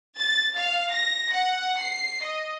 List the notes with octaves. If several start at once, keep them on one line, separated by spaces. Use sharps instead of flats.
A6
F5
A#6
F#5
C7
D#5